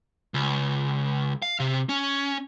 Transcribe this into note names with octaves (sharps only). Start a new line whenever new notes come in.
C#2
F5
C3
C#4